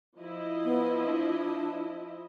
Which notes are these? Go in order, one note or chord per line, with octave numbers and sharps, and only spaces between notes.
F3 E4 D#5
B3
D4